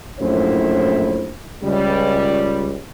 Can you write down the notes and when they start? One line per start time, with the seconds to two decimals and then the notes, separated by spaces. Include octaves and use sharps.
0.20 A#1 F#2 A2 E4 C5
1.64 C#2 G3